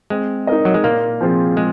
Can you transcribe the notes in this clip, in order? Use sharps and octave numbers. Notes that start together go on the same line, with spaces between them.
G#3 C4
D#4 A#4 D#5
F#3
G#3
A#2 A#3
F3 C4 F4 G#4
G#3